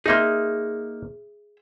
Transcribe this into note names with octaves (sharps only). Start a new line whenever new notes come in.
A#3 D#4 G#4 E5 C6